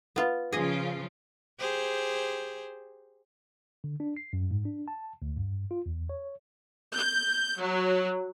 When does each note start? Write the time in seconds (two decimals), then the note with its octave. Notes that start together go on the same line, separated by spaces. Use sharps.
0.16 B3 F4
0.52 C#3 F3 F4 G#4 D#5
1.59 G4 G#4 C5
3.84 D3
4.00 D4
4.17 C7
4.33 F#2
4.51 G#2
4.65 D4
4.88 A5
5.22 D2
5.37 G2
5.71 F4
5.86 E2
6.09 C#5
6.95 G6
7.60 F#3